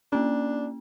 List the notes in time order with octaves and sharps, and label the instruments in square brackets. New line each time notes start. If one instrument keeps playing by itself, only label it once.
[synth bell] A#3 C#4 [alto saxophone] D4